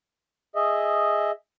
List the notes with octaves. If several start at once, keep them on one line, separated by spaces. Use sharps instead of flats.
G#4 D#5 E5